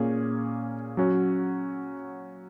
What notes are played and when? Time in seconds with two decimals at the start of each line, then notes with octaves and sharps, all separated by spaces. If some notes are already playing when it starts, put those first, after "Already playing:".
Already playing: A#2 A#3 C#4 G#4 C#5
0.97 F#3 C#4 F#4 C#5